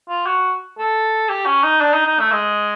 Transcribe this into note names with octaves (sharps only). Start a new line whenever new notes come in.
F4
F#4
A4
G4
C#4
D#4
D4
D#4
D#4
A3
G#3